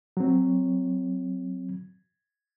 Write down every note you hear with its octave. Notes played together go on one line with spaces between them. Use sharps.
F#3 C4